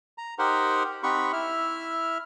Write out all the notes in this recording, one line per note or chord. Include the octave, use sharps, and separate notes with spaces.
A#5
D#4 G4 A#4 C5 F#5
C4 D#4 G4 F#5 B5 C#6
E4 E5 F6